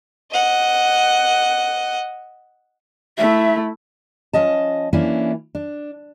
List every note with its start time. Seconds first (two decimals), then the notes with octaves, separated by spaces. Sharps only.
0.31 D#5 F#5
3.18 A3 E4 E5
4.33 F3 C#4 D#5 A5
4.93 E3 A#3 C#4 D4 E4
5.55 D4